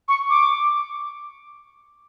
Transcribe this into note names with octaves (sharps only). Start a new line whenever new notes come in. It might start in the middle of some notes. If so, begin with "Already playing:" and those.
C#6
D6